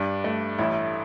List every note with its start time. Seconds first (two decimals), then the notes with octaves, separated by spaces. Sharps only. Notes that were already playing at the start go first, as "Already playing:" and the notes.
Already playing: G2 D4
0.24 A3
0.58 A1 E4